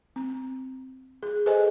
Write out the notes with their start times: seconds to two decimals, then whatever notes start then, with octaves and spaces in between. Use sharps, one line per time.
0.16 C4
1.23 G#4
1.46 G#4 A4 B4 C5 D#5 G#5